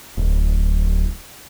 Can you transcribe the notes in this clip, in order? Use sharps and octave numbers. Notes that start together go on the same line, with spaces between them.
D1